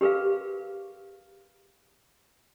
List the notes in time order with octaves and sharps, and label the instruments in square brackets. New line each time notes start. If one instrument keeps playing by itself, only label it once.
[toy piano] G4 G#4 A#4 B4 F5